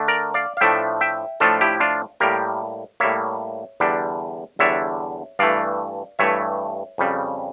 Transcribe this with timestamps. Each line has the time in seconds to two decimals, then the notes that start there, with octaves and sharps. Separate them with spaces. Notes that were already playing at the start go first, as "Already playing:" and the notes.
Already playing: D3 A3 D4
0.08 A#4 D5
0.34 D5 F5
0.57 F5
0.61 A2 F3 A3 D4 E5 G5
1.01 E5 G5
1.40 A2 F3 A3 D4 F4 A4
1.61 E4 G4
1.80 D4 F4
2.20 A2 G3 A#3 G4 A#4
3.00 A2 G3 A#3 C#5 E5
3.80 E2 D3 G3 D4
4.59 E2 D3 G3 D4 C#5 E5
5.39 G2 E3 A3 D5 F5
6.19 G2 E3 A3 C#5 E5
6.98 F2 C#3 G3